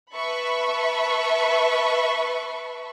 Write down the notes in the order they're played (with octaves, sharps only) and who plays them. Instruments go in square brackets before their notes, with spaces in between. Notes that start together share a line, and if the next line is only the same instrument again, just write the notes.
[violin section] B4 E5 A5 B5 C#6